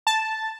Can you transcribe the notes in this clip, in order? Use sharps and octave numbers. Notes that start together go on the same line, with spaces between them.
A5